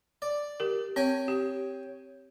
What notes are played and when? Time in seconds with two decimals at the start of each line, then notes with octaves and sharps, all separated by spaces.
0.22 D5
0.60 G4 A#4
0.96 C4 C#5 G5 G#5
1.28 G4